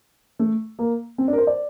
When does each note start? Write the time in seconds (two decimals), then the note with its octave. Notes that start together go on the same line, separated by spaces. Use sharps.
0.39 A3
0.79 A#3
1.18 C4
1.28 D4
1.33 A#4
1.38 C5
1.47 D5